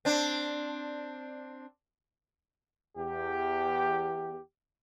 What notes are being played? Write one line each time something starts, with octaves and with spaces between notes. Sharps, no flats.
C4 D4
E2 G4